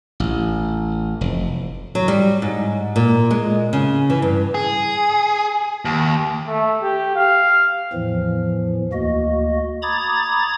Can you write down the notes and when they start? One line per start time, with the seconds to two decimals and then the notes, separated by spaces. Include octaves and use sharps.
0.20 A1
1.21 F1
1.95 F#3
2.08 G3
2.42 G#2
2.96 A#2
3.31 G#3
3.73 C#3
4.10 E3
4.22 G2
4.55 G#4
5.85 D#2
6.48 A3
6.82 G4
7.16 F5
7.93 E2 A2 E3 F3
8.93 D2 A#3 F#4 D#5
9.82 A#5 B5 D6 D#6 G#6 A6